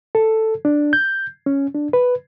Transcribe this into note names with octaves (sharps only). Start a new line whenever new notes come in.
A4
D4
G6
C#4
D4
B4